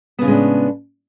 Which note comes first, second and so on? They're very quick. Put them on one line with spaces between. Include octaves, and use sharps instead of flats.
B3 C#3 A2 G#3 D4